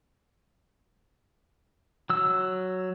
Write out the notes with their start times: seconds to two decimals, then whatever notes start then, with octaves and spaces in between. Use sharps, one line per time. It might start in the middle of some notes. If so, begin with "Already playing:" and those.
2.10 F#3 E6